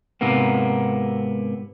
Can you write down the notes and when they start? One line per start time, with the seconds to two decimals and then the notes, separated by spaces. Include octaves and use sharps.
0.21 G#2 C3 A#3 B3